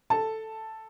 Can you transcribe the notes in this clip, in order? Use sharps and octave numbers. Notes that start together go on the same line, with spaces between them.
A4 A5